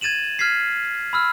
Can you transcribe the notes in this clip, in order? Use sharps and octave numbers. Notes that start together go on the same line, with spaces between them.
G#6 A6 D#7 E7 F#7
F6 G#6 B6 C7
B5 E6 F6